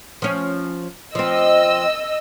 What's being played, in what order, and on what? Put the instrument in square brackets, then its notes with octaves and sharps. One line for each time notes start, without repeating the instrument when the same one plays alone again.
[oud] F3 C#4
[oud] F3 C4 [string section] D#5 E6